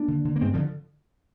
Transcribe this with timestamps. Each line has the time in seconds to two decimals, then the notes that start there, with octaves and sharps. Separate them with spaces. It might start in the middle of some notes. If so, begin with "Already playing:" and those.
Already playing: A#3 D4
0.08 D3
0.25 D3
0.36 A#3
0.41 G2 G#3 C4
0.54 D3 F3